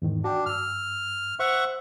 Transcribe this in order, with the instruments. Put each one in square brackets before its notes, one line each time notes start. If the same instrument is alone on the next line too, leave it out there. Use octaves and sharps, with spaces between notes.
[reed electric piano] E2 G#2 D#3
[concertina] D4 [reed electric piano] F#4 G5
[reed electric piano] G2 E6 [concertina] F6
[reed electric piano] C5 [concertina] E5 F#5 C#6